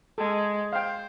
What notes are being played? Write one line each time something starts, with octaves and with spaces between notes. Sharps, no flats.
G#3 A4
C5 F5 G5